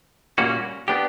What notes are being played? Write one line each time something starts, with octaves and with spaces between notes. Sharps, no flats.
A#2 G3 A#3 C#4 F#4
B3 D4 G4